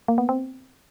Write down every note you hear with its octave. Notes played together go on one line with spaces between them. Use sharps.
A#3
B3
C4